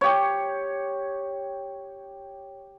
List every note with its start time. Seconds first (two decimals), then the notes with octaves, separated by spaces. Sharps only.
0.01 G4 C#5